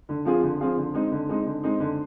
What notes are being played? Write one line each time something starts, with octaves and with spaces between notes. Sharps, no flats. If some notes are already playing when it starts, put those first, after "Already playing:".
D3
F3 C4 F4 G#4
D3
F3 C4 F4 G#4
D3
G#3 C4 D#4
D3
G#3 C4 D#4
D3
G#3 C4 D#4
D3